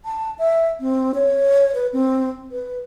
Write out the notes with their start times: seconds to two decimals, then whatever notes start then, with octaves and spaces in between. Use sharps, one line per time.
0.05 A5
0.39 E5
0.80 C4
1.15 C#5
1.75 B4
1.93 C4
2.51 B4